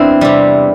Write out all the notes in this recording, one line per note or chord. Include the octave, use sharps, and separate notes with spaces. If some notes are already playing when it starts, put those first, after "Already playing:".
Already playing: E2 E3 C4 D4 E4
C3 G3